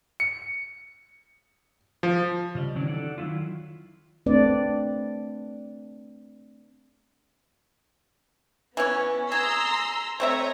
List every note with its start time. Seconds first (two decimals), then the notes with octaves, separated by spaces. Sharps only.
0.20 C#7
2.03 F3
2.55 C#3 G3 D#5
2.75 D#3 F#3 C#4 D4 E4
2.88 D#4 A4 D5 F#5
3.18 D#3 F#3 E4 F4
4.26 A3 C4 D4 B4 D5
8.77 E3 B3 C#4
9.32 G#4 A#5 C6 E6
10.20 A3 C4 C#5 D#5 E5 A#5